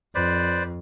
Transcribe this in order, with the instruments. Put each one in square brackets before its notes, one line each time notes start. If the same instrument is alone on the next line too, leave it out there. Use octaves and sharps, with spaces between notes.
[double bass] F2 [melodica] B4 C5 D5